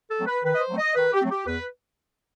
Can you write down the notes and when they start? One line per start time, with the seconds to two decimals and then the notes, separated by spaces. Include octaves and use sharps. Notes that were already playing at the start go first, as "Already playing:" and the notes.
0.10 A4
0.18 F#3 A3 C4
0.26 B4
0.44 D#3 B4
0.54 D#5
0.61 C5
0.69 F#3 A3 C4
0.78 D#5
0.95 D#3 B4
1.13 G4
1.21 F#3 A3 C4
1.30 G4
1.46 E2 B4